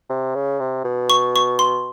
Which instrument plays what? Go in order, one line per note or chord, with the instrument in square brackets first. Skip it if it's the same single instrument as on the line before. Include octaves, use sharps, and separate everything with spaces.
[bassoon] C3
C#3
C3
B2
[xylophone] C#6
C#6
C6